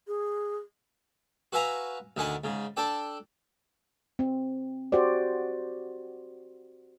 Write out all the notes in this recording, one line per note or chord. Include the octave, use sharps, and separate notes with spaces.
G#4
F#4 B4 E5 F5 G#5 A#5
D2 D#3 D4 F#5 G#5 B5
G#2 C#3
D4 A4 D5 G5
C4
F#4 G4 C5 D5